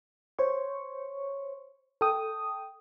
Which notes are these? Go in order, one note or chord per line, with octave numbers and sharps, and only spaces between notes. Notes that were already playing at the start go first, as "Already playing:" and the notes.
C5 C#5 C#6
A4 G5 D#6